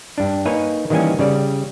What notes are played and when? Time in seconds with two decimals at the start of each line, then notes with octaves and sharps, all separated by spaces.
0.18 G2 D4
0.46 A#3 D#4 B4 C#5 G#5
0.90 D#3 E3 G3 A#3 C#4 G#5
1.19 C#3 G3 D5